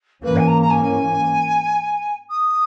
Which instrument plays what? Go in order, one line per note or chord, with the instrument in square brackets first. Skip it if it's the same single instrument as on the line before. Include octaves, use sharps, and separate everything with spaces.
[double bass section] G#2 E3 A#3 C#4 [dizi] B4
[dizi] G#5
A#5
A#5
G#5
D#6